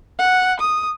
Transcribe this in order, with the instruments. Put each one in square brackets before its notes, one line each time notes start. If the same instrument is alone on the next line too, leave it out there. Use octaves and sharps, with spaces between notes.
[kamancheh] F#5
D#6